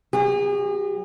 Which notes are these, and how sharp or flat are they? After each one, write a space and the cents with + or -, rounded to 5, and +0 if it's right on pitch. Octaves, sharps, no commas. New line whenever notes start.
F#3 +25 G#4 -40